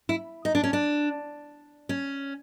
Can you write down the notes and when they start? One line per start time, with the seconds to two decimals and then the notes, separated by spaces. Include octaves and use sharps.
0.09 E4
0.45 D#4
0.55 D4
0.63 C#4
0.73 D4
1.89 C#4